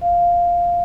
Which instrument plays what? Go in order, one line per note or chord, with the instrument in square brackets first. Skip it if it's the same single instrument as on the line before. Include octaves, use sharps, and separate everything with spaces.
[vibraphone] F5